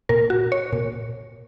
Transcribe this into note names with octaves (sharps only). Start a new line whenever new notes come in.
A#2 A#4
F#4
C#5
A#2